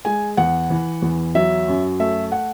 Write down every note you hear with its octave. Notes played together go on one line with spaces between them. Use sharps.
G#3 G#5
E2 F#5
E3
E2
F#3 E5
F#2
A3 E5
F#5